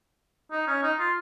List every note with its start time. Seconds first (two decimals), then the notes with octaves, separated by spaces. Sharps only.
0.51 D#4
0.67 C#4
0.83 D#4
0.99 F4